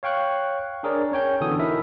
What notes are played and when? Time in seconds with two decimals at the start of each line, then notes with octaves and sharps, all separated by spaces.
0.03 C#5 F5 G5 C#6 F#6
0.83 D4 G#4 A#4 C#5 D5
1.12 C#4 C#5 G5 G6
1.41 B2 D3 E3 F#4 A4 D#6
1.59 D#4 E4 A#4 E5